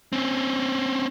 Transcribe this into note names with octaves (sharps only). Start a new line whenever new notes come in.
C4 C#4